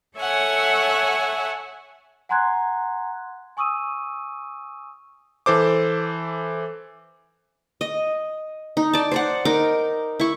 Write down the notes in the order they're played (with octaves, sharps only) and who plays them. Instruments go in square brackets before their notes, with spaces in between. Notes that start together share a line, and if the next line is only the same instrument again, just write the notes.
[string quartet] A4 C#5 E5 F#5 G#5
[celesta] F#5 G#5 A#5 C6 F#6 G#6
G#5 C#6 D#6 E6 D#7
[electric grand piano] E3 A4 C5 D6
[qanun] D#5
D#4
D5 A5
C5 D5 F#5
D#4 A#4 D6
E4 C#6